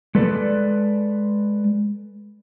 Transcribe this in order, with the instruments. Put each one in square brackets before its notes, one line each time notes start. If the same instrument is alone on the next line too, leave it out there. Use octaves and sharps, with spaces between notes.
[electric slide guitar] G#3 A4 B4 D5